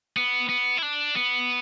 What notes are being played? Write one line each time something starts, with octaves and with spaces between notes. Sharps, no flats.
B3
B3
E4
D4
B3